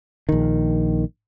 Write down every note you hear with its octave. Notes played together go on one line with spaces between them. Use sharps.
A#1 D#3